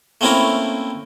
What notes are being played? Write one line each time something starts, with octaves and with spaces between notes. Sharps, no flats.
A3 A#3 C4 C#4 E4 A#4